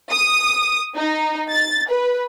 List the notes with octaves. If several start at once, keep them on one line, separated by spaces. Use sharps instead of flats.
D#6
D#4
A6
B4